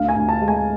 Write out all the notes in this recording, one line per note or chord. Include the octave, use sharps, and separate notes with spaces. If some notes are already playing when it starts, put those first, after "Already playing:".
Already playing: D2 F5
G#5
D2
A5
G#3
G#5